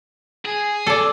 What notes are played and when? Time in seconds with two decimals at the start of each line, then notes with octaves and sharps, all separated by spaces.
0.45 G#4
0.87 A4 D5